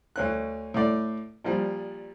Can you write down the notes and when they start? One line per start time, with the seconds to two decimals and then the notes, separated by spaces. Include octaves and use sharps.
0.16 D2 C#4 F#6
0.74 A2 D5
1.44 A#2 F3 G3